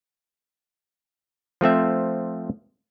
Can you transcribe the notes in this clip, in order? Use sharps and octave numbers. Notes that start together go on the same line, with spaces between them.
F3 A3 C4 E5